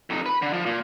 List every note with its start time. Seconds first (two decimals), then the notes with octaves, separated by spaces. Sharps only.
0.10 F2 D#4
0.26 B4 B5
0.42 D3
0.53 F3
0.66 A#2